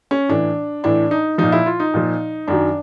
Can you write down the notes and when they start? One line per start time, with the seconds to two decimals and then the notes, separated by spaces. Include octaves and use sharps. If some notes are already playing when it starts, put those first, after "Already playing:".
0.11 C#4
0.29 A2 E3 D4
0.84 A2 E3 D4
1.11 D#4
1.38 A#2 F3 D#4
1.52 E4
1.66 F4
1.80 D#4
1.94 A#2 F3
2.47 F#2 D#3 F#3 D4